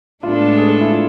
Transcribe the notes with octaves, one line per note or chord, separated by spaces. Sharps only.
A2 G#3 B3 D4 F4 A4
G#4
E4
F4